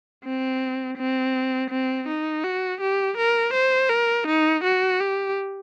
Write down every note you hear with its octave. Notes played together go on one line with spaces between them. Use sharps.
C4
C4
C4
D#4
F#4
G4
A#4
C5
A#4
D#4
F#4
G4